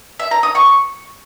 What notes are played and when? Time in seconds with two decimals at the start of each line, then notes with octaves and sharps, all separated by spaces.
0.19 E5
0.31 A#5
0.43 D#6
0.55 C#6